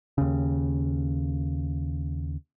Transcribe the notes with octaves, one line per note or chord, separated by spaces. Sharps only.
D#2 C#3